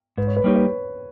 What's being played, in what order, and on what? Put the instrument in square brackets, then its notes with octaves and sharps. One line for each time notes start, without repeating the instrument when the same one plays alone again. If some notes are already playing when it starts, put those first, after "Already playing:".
[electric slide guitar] G#2 [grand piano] B4
[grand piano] C#5
B4
[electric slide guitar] G3 A#3 D#4 G4 [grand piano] C#5
[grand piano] B4